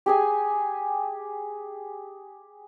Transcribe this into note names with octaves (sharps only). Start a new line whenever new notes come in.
G4 G#4 G#5